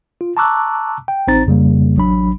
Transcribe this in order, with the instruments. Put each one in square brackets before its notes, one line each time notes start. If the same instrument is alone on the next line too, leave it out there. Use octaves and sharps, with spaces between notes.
[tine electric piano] F4
A5 A#5 C#6 D6 E6 F#6
G5
A1 C4 D#4 C5 A#5 A6
F2 C#3 G3 A#3
A1 F#3 D4 B5